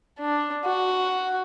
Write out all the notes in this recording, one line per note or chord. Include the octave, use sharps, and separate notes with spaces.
D4
F#4